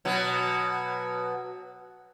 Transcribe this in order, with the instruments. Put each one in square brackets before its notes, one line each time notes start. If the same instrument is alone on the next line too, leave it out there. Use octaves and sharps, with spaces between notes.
[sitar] B2 F#3